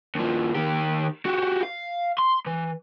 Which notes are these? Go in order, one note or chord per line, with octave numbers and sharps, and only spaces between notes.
D#2 F3
D#3 G4
F#4 G4
F5
C6
E3